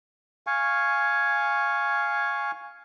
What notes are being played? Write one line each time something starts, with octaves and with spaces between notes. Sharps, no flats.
F5 G#5 C#6